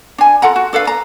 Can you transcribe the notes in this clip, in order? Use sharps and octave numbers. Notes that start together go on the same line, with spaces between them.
D4 G#5
F4 A4 F#5 A#5
F#4
D4 A4 B4 F5
A#5